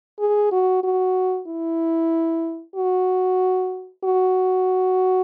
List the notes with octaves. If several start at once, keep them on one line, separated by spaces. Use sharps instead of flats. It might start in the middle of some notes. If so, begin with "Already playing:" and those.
G#4
F#4
F#4
E4
F#4
F#4